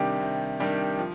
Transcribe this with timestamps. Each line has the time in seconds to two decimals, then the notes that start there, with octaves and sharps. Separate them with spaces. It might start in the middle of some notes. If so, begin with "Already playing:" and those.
Already playing: C3 D#3 G3 D4 G4
0.20 C3
0.60 D#3 G3 D4 G4
0.99 F3